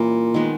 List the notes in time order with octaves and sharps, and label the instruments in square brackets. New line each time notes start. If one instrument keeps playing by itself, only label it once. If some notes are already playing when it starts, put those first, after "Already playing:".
Already playing: [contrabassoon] A#2 [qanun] E3 G3 C#4
[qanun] D#3 G#3 B3